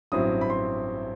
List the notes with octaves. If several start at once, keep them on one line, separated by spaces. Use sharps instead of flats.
A1 G2 F#3 C4 E4 D#6
B5
C6